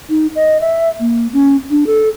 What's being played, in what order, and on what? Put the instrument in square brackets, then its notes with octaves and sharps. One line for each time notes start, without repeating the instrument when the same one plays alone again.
[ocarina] D#4
D#5
E5
A#3
C#4
D4
A4